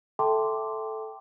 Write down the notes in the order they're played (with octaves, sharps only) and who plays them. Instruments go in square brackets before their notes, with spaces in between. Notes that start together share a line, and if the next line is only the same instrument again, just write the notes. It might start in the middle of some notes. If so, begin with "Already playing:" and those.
[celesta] A4 E5 G5 A5 C6 D6